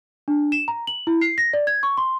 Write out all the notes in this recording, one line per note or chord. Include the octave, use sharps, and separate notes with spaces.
D4
E7
A#5
F#7
E4
C7
A#6
D5
G#6
C#6
C6